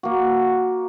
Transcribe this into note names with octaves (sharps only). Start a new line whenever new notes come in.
A#3 F#4